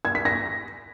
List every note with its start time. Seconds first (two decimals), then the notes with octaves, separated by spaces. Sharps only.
0.05 G#6
0.15 B6
0.25 A#6